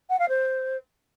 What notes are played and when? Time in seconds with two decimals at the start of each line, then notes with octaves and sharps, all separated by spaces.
0.09 F#5
0.19 F5
0.29 C5